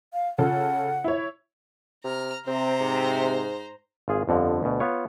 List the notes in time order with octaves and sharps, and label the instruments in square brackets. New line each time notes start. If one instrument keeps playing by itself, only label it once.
[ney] F5
[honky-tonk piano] C#3 F4 A4 [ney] F#5
[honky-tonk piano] E4 C#5
[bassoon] C3 [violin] A#5 F6
[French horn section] C3 [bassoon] C4 [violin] C5 A#5
[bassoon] G#2
[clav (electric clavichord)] G#1 F4 G#4
G1 F2 D3 F3
D2 B2
B3 F4 C#5